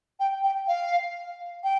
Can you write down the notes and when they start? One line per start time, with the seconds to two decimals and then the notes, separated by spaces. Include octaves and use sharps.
0.20 G5
0.44 G5
0.68 F5
1.64 G5